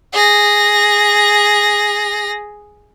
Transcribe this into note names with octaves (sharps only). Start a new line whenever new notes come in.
G#4 A#6